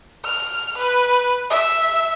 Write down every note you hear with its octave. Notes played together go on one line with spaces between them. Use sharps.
F6
B4
E5